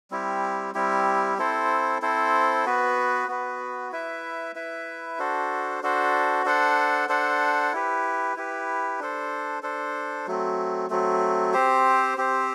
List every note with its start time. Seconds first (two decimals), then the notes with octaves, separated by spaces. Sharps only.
0.11 G3 C4 E4 G4
0.75 G3 C4 E4 G4
1.37 C4 E4 A4 C5
2.02 C4 E4 A4 C5
2.66 B3 F#4 B4
3.28 B3 F#4 B4
3.92 E4 B4 E5
4.55 E4 B4 E5
5.19 D4 F#4 A4 C5
5.83 D4 F#4 A4 C5
6.45 D4 A4 C5 F#5
7.09 D4 A4 C5 F#5
7.73 E4 G4 B4
8.36 E4 G4 B4
9.00 D4 A4 C5
9.63 D4 A4 C5
10.27 F#3 A3 C4
10.90 F#3 A3 C4
11.53 C4 G4 C5
12.17 C4 G4 C5